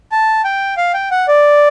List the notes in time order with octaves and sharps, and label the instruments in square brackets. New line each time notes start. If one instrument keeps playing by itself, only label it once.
[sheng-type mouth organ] A5
G5
F5
G5
F#5
D5